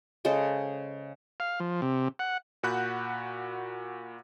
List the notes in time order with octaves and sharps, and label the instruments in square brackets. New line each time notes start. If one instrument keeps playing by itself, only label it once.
[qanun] C#3 G#3 A4 C5
[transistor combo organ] F5
F3
C3
F#5
[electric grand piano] A#2 F#4 F#5 B5 F#6 G6